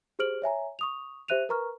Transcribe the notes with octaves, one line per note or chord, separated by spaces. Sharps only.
G4 G#4 C5 F6 D7 F#7
C#5 E5 G#5 A#5
C#6 D#6 F7
G4 C5 E5 F#6 D#7 F7
A#4 B4 A#5 C#6 F6